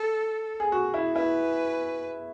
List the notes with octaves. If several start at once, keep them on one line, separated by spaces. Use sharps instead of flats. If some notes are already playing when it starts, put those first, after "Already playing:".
Already playing: A4
G#4
F#4
E4
E4 B4